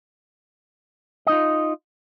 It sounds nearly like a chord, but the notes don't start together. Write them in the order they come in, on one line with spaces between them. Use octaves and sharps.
D#5 D#4 F4